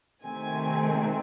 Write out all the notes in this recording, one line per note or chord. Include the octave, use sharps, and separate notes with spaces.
C3 D#3 A3 C4 G#5